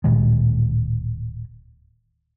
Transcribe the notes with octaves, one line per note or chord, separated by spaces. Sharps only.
D1 A#2 D#3 G#3